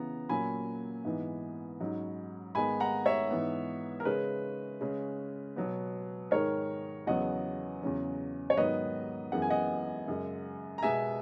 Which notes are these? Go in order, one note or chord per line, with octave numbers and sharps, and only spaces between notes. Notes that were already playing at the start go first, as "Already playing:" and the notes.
Already playing: C#3 E3 B3 A#5
A#2 F#3 C#4 G#5 B5
G#2 E3 B3
G#2 F#3 C#4
G#2 D#3 G#3 B3 G#5 B5
F#5 A#5
C#5 E5
G#2 E3 B3
A#4
C#3 G#3 C#4 B4
C#3 G#3 C#4
B2 F#3 B3
G#2 D#3 G#3 A#4 C#5
E2 C#3 F#3 B3 D#5 F#5
E2 C#3 F#3 C#4
C#5
G#2 D#3 F#3 B3 B4 D#5
F#2 E3 G#3 B3 F#5
G#5
D#5 F#5
F#2 C#3 G#3
A#5
B2 G#3 B3 E5 G#5